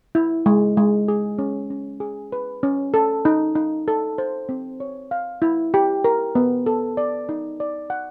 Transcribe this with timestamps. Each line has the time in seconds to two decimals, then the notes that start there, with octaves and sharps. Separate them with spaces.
0.15 E4
0.46 G#3
0.77 G#3
1.08 G#4
1.39 C#4
1.70 C#4
2.00 G#4
2.32 B4
2.63 C#4
2.94 A4
3.25 D#4
3.55 D#4
3.88 A4
4.18 C5
4.49 C4
4.80 C#5
5.11 F5
5.42 E4
5.74 G4
6.04 A#4
6.35 B3
6.66 A4
6.97 D5
7.29 D#4
7.60 D5
7.90 F#5